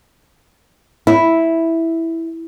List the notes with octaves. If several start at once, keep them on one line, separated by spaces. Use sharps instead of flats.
E4